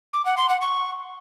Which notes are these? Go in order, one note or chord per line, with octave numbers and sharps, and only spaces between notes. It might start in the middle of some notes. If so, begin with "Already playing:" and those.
D6
F#5
C6
F#5
C#6